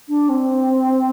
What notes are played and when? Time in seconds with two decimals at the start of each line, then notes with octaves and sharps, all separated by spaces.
0.09 D4
0.29 C4